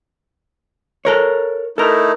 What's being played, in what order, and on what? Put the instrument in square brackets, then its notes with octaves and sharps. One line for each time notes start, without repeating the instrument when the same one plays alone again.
[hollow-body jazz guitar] A4 A#4 C#5
[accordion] A3 D#4 E4 [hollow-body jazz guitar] A4 A#4